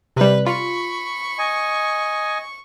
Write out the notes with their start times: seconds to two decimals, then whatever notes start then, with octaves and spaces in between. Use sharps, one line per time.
0.16 C3 G3 B4
0.46 F4 B5 C#6
1.39 D#5 G#5